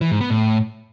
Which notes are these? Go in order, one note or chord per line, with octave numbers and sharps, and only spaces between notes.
E3
G#2
B3
A2